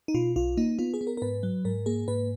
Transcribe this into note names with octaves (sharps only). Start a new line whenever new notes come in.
D#4
B2 F4
B1 F4
A#3 D#4
B3 F4
G#4
B3
A#4
A#4
G#2 B4
F#3
G#2 A#4
A#3 G#4
G#2 B4